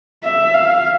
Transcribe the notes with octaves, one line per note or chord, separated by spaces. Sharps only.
E5
F5